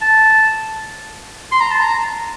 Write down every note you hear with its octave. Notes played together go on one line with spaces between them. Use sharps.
A5
C6
A#5
A5
A#5